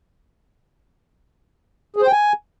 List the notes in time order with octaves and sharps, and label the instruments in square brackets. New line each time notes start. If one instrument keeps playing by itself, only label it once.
[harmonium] G#4
C5
G5
G#5